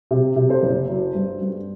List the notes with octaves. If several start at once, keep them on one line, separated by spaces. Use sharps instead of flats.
C3
C3
A4 C5
F#1
F#3
G2
G2